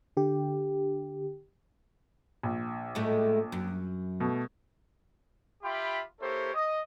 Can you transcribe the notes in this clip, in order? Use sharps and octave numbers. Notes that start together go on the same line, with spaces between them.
D3 G4
A#1
A2 G#3 A3
F#2
B2 A3
F4 G4 E5 G5 B5
A#3 E4 G4 A4 C5 C#5
D#5